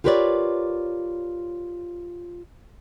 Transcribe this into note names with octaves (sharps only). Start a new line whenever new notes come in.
F4 G4 A#4 B4 C#5 D5